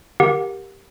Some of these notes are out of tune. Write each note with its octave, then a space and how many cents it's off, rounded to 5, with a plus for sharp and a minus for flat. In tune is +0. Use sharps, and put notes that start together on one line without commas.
G4 +0 A#4 +0 F#5 -35